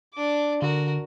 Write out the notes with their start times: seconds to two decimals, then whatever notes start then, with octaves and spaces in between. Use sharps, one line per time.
0.14 D4 D6
0.62 D3 F#4 A#4